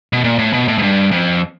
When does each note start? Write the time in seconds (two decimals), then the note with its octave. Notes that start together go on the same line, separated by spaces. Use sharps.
0.13 B2
0.24 A#2
0.39 A2
0.53 B2
0.68 A2
0.78 G#2
0.82 G2
1.12 F2